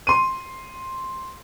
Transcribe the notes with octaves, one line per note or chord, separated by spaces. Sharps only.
C6 D#7